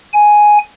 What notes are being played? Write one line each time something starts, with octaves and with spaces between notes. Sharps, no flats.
G#5